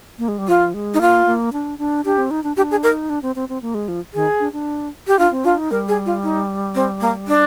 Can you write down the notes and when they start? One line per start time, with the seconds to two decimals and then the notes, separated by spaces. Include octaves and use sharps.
0.19 A#3
0.28 G#3
0.38 G3
0.48 F3 F4
0.74 G#3
0.94 D#4
1.00 A#3 F4
1.26 A#3
1.53 D4
1.79 D4
2.05 D4 G4
2.18 C4
2.31 D#4
2.44 D4
2.57 D4 G4
2.71 G#4
2.83 D#4 A#4
3.10 D4
3.22 C4
3.36 C4
3.49 C4
3.62 A#3
3.74 G#3
3.88 F3
4.13 D#3 G#4
4.40 D4
4.53 D4
5.07 G4
5.18 D4 F4
5.31 C4
5.44 D4 F4
5.58 D#4
5.71 G3 A#4
5.88 G#4
6.06 F4
6.23 D#4
6.75 C4
7.01 A#3
7.28 D4